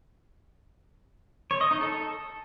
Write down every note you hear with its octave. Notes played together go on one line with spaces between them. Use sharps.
C#5
D#5
D#4
A4